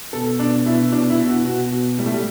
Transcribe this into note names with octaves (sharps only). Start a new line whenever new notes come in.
B2 A4
B2 D4
B2 E4
B2 D4
E4
B2
F#4
B2 F#4
B2
A2 G3
A3
G3